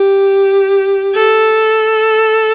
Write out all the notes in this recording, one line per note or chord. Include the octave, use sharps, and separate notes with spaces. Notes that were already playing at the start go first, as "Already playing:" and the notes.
Already playing: G4
A4